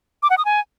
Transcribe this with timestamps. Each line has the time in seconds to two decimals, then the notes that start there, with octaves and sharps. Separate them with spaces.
0.23 D6
0.30 F#5
0.38 D#6
0.45 G#5